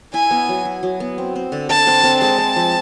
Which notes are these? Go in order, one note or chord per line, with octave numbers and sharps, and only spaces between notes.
E4 G#5
B3
F#3
E4
F#3
B3
C4
C4
D3
D3 A5
C4
C4
G#3 A5
C4
F3